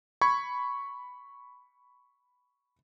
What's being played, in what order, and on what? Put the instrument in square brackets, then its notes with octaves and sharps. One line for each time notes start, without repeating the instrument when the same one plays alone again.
[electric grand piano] B5 C#6 G#6